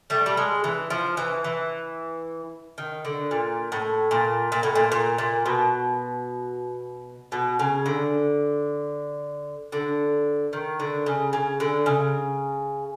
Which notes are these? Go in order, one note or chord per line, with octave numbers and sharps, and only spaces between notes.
G3 A3
G3
G#3
E3
F3
E3
E3
D#3
D3
A#2
A2
A#2
A#2
A2
A#2
A#2
A#2
B2
B2
C#3
D3
D3
D#3
D3
C#3
C#3
D3
C#3